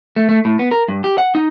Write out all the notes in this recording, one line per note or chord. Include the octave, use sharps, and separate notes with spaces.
A3
A3
A2
B3
A#4
G2
G4
F#5
D#4